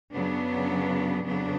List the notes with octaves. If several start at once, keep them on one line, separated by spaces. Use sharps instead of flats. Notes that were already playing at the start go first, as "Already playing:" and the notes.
F#2 C#3 F#3 B3 D4
F2 C#3 F#3 B3 D4